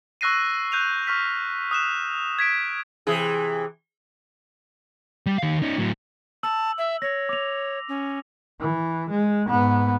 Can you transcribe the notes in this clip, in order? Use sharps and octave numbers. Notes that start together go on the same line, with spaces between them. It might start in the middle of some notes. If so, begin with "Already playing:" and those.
C#6 E6 F#6 A#6 C7 D#7
F#6 G6 D#7 F7
C#6 F6 B6
D#6 F#6 E7 F7
G#6 B6 D7
C3 E3 G#4
G3
D#3 F5
C#4 D#4
A2 F#3
A5 E6 F#7
E5
C#5 A#6
D6 F7
C#4
E3
G#3
G#2 B3